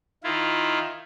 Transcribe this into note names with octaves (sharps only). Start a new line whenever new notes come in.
D#3 E4 F4